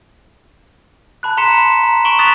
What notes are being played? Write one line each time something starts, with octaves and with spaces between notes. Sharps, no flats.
A5 B5 F#6
A#5 C6 B6 C#7 E7
B5
A#5
C#6 D7 E7 F#7 G7
D#6 F#6 A6 B6 E7 F7